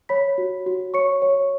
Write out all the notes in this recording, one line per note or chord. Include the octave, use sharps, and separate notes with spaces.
C#5 B5 B6
F#4
F#4
C#5 C#6 C#7
C#5